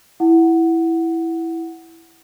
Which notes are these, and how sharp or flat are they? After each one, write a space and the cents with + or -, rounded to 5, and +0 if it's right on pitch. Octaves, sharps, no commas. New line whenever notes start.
E4 +0 F#5 +0